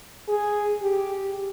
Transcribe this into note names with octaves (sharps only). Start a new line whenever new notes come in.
G#4
G4